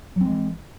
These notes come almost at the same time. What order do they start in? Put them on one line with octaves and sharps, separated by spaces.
F#3 C4 G#3 E3